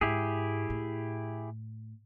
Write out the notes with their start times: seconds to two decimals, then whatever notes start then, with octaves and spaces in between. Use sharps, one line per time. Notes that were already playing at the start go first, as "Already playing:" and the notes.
0.01 G#2 E4 G4 G#4
0.70 A2